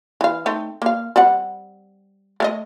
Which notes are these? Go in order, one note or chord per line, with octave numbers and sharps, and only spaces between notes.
E3 F5
A3 C4 D#4
A#3 F5
G3 C4 F#5
A3 A#4 D#5